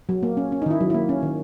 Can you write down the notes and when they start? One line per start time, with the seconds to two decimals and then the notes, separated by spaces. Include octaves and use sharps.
0.09 F#3
0.23 A#3
0.37 C#4
0.52 C#4
0.62 D#4
0.66 D#3 E4
0.81 F#3
0.90 A#3 E4
1.09 C#4
1.23 D#3